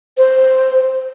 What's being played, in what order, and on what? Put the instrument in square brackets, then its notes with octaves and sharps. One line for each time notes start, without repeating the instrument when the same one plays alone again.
[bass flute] C5